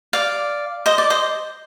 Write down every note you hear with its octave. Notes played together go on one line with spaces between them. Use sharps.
D5 F5
C5 D#5
D5
C5 D#5